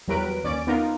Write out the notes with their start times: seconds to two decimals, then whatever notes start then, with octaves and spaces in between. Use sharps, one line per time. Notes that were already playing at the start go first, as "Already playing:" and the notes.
0.07 E2 F#3 G3 A#4 B4 D7
0.44 D#2 C#4 D5 D6 D7
0.67 B3 D#4 F4 A#4